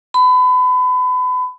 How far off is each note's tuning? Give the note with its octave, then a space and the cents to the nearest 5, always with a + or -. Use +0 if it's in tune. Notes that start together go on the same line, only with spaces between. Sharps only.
B5 +30